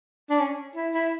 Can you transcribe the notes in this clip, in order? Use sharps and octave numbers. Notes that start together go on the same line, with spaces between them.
D4
C#4
E4
E4